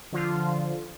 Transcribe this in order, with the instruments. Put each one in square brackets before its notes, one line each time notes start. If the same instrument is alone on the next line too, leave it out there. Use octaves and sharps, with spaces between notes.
[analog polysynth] D3 F3 F4